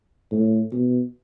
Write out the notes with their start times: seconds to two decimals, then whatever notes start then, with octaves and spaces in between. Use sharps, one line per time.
0.32 A2
0.72 B2